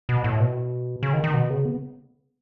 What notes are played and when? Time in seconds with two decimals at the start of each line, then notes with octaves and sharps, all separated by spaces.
0.09 B2
0.24 A2
0.40 B2
1.03 C#3
1.13 D#3
1.24 D#3
1.34 B2
1.50 C#3
1.65 B3